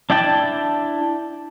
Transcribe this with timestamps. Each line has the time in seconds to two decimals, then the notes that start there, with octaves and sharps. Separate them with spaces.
0.10 D4 E4 D5 G5 A5